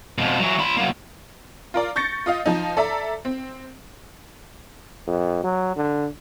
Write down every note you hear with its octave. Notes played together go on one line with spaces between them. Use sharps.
F2 B2
E3 F#3
F4 B5
F#3 A#3
F4 A#4 D5
C#6 G6 A6 A#6 C#7
F4 D#5 F5
F3 D#4
A4 D5 E5 A#5
C4
F2
F#3
D3